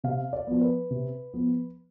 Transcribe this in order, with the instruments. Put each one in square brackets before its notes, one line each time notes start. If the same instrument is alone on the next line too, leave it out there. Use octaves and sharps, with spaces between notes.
[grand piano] C3 F5
D5
F3 B3
B4
C3
F3 B3